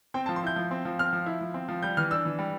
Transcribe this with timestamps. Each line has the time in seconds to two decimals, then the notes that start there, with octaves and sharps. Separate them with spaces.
0.14 C4 G5
0.26 A5
0.29 F3
0.36 C6
0.43 E4 G6
0.56 F3
0.71 C4
0.85 F3
0.99 C4 F6
1.13 F3
1.26 E4
1.41 F3
1.54 C4
1.69 F3
1.83 G3 G6
1.97 E3 F6
2.11 D4 E6
2.25 E3
2.39 G3